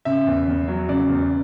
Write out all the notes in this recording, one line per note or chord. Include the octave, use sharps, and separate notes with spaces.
C#3 E5
E2
E2
F#3
C#3 D5
E2